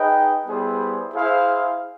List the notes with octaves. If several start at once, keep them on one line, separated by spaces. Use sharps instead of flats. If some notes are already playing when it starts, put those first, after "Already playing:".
Already playing: D#4 G#4 B4 D#5 G5
G3 B3 E4 G#4 C5
E4 G#4 C5 F5